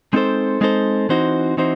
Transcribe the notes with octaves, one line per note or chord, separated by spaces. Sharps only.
G#3 C4 D#4 A4 C5
G#3 C4 D#4 A4 C5
E3 C4 D#4 F#4 C5
E3 C4 D#4 F#4 C5